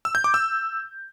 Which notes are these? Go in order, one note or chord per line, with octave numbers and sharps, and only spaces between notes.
E6
G6
D6
E6